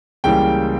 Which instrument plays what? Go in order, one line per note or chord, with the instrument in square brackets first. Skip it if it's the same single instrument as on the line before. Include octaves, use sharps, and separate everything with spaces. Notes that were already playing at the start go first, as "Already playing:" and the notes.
[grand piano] C#2 C#3 E3 G3 A#3 G5